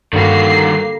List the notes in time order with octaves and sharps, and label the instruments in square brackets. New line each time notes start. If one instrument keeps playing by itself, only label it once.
[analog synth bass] G2 [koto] D3 G3 [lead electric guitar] D#3 F#4 [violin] A#3 C7